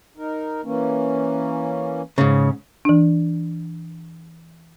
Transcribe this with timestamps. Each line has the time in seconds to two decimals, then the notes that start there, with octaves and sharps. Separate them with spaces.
0.17 D#4 A#4
0.64 E3 A#3 C#4
2.18 G#2 C#3
2.85 E3 D4